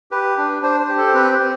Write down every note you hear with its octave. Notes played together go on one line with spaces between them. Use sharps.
G4 B4
D4
D4 C5
C5
G4
A4
C5
C4 B4
C5
C4